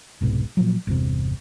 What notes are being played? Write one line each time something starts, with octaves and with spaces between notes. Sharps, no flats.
E1 C2 G#2 B2
A#2 F3 F#3
G1 E2 C3